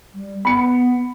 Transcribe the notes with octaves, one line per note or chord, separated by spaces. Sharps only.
G3
B3 B5 C#7